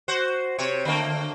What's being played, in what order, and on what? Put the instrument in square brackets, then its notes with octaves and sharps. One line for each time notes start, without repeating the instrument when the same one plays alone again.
[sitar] F#4 C5
C3 C#5
D3 A3 A#3